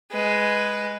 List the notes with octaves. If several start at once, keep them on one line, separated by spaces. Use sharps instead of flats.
G#3 B4